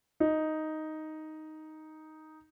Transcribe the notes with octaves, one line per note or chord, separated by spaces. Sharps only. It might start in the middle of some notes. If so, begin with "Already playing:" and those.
D#4